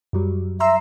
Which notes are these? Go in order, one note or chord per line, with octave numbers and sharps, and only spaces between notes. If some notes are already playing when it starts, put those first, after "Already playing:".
F#2 F#3 G3
E5 A#5 C6 E6